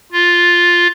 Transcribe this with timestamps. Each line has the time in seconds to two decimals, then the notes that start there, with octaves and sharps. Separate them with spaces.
0.12 F4